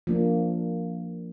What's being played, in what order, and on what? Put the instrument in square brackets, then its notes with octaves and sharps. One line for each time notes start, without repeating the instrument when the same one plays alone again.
[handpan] F3 A#3 D4